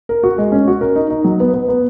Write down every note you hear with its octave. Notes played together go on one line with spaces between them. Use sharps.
A#4
F#4
G#3
C#4
F#4
A#4
D#4
D#4
F#3
B3
B3
B3